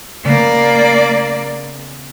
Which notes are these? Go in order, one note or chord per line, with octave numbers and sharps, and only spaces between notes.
C#3 A#3 B3 D5